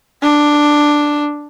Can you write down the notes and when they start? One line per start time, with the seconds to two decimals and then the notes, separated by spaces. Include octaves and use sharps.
0.22 D4